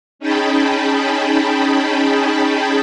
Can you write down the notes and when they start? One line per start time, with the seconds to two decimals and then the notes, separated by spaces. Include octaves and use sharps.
0.19 C#4 D#4 G#4 G5 A5 B5